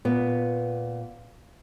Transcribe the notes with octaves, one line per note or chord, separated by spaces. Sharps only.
A#2 B3